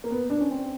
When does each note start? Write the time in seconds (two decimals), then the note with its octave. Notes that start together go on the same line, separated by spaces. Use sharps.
0.04 A#3
0.11 B3
0.30 D4
0.40 C#4
0.51 C4